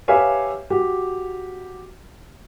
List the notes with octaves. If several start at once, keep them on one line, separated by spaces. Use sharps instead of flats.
G4 B4 C#5 E5 F5 G#5
F#4 G4